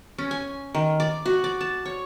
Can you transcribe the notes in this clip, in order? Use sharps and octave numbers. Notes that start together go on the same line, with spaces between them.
C#4
G#5
D#3
D5
F#4
D5
A5
C#5